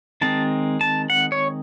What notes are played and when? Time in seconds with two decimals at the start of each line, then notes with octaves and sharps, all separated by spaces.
0.21 D#3 G#3 C4 A5
0.81 A5
1.10 F#5
1.32 C#5